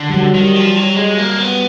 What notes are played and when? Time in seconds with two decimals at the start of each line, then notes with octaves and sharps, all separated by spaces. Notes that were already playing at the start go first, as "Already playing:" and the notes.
Already playing: D3
0.10 G3
0.14 F#3
0.35 D#3 G3
0.56 F3
0.76 F#3
0.96 G#3
1.18 A#3
1.39 B3